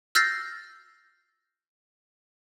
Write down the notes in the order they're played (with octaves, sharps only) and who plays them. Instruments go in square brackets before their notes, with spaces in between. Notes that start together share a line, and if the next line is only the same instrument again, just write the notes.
[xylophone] E6 F6 G6 A6 A#6 C7